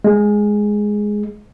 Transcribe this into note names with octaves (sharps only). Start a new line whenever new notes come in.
G#3